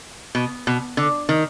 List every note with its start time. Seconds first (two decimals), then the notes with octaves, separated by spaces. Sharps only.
0.35 B2
0.67 B2
0.97 D3
1.29 D#3